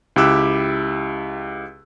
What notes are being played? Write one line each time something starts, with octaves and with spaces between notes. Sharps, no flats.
C#2 E4 G4 D6 E6 F#6